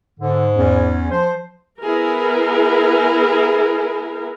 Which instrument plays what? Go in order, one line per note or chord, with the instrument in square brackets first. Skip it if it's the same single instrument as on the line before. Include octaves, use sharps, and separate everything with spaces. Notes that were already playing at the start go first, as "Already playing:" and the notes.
[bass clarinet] G#2 [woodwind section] D3
[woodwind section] E2 C#4
[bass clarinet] F3 [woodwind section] C5
[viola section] B3 E4 G#4 A#4